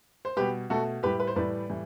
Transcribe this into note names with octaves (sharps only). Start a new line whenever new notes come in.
C5
B2 G3 G4 B4
B2 A3 F#4 A4
A2 G3 G4 B4
B4
C5
A2 E3 G3 B4 D5
A2 E3 G3